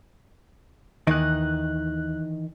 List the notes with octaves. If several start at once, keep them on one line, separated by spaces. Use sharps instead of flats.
D#2 D#3 E3 D#4 F#6